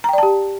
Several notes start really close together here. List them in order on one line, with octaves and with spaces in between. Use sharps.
A#5 G5 D5 A5 G4